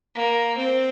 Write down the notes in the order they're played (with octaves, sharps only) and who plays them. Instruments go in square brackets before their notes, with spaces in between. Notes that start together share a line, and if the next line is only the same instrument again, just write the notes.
[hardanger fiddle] A#3
C4